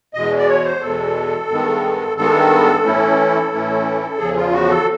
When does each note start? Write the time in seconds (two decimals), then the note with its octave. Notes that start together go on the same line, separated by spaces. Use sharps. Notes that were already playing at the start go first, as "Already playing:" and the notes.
0.14 E2 B2 G#3 D#5
0.38 D5
0.48 C#5
0.65 C5
0.81 E2 B2 G#3 A4
1.49 G2 D#3 G#3 B3
2.16 G2 D#3 G#3 B3 A4
2.84 A2 E3 A3 C#4 E4
3.52 A2 E3 A3 C#4 E4
4.18 E2 C#3 F3 G#4
4.36 F4
4.53 F#4
4.69 A4